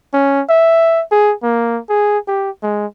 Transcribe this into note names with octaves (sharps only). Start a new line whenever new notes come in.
C#4
E5
G#4
A#3
G#4
G4
G#3